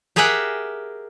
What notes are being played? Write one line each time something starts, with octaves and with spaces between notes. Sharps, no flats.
G4 G#4 A#4 E5 F#5 G5